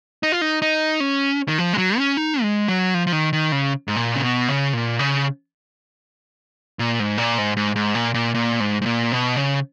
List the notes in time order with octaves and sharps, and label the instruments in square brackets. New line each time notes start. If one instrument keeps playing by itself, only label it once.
[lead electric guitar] D#4
F4
D#4
D#4
C#4
D#3
F3
G#3
F#3
C#4
D#4
G#3
F#3
F3
F3
D#3
D#3
C#3
G#2
A#2
C#3
B2
C#3
A#2
C#3
A#2
G#2
A#2
G#2
G#2
G#2
A#2
A#2
A#2
G#2
G#2
A#2
B2
C#3